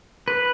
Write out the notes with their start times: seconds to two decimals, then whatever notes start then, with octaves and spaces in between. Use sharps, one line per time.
0.28 B4